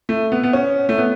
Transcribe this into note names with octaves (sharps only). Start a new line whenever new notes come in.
A3
B3
B3
C#4
A3
B3